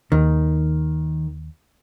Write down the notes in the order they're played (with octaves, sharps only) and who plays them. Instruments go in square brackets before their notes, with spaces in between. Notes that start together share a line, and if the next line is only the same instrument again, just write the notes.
[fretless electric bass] D#2 [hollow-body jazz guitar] D#3